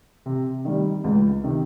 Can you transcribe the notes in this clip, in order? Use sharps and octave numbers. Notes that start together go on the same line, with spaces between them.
C3
D#3 G3
C#2
C3 D#3